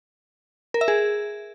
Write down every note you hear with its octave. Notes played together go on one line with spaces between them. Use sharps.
A#4
E5
G#4